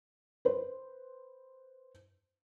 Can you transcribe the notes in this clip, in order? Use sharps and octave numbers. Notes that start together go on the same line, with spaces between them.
B4 C5